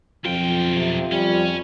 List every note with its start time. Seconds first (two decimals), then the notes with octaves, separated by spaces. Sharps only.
0.25 B1 F2 F4 G5
0.76 C3
1.12 F2 G3 C#4